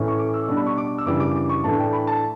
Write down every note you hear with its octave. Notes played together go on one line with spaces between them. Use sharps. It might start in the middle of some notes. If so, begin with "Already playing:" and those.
Already playing: A2 E3 A3 C#4
C#6
D6
E6
B2 G3 D4
B5
C#6
D6
E6
F#2 C#3 E3 G3 D4 D6
D6
D6
C#6
A2 E3 A3 D4 A5
G5
B5
A5